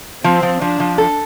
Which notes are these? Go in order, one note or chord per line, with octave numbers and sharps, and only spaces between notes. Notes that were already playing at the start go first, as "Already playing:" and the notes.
F3 C4
F3
F3 D4
F3
A4